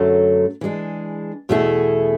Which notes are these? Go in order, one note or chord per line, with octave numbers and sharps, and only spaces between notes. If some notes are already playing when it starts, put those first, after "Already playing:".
Already playing: F#2 D3 F#3 A3
E3 G#3 D4 G#4
E2 B2 A3 E4 G#4